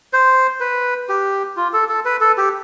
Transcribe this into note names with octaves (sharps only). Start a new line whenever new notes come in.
C5
B4
G4
F4
A4
A4
B4
A4
G4